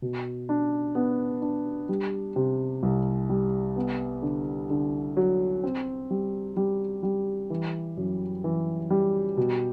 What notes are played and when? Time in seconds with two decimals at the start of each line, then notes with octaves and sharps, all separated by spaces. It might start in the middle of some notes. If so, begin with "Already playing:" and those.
0.02 B2
0.49 D4
0.95 B3
1.42 D4
1.89 G3
2.36 C3
2.83 C2
3.29 G3
3.76 B3
4.22 D3
4.70 D3
5.17 F#3
5.63 C4
6.10 G3
6.57 G3
7.03 G3
7.50 E3
7.97 F#2
8.44 E3
8.90 G3
9.37 B2